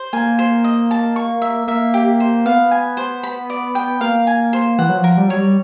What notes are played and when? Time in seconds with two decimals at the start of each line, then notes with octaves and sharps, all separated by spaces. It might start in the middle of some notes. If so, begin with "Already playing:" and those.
Already playing: C5
0.13 A#3 G#5
0.39 C5
0.64 D#5
0.91 A5
1.16 C#6
1.42 E5
1.68 A#3 E5
1.94 G4
2.20 C5
2.46 B3 F5
2.71 G#5
2.97 C5
3.23 B5
3.50 D5
3.75 G5
4.00 A#3 F5
4.27 G#5
4.53 C5
4.79 E3 F#5
4.89 F#3
4.98 F3
5.04 A#4
5.18 G3
5.28 F#3 C#5
5.37 G3